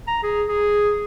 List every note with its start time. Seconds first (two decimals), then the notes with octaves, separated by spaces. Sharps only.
0.07 A#5
0.23 G#4
0.48 G#4